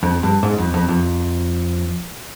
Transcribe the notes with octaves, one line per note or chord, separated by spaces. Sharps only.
F2
G2
G#2
F2
F2
F2